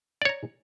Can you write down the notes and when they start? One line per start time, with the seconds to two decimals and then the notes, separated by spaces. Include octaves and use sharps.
0.22 D5
0.25 C#5
0.29 A#5